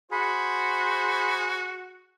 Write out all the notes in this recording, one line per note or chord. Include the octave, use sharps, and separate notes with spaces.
F#4 G#4 C5 B5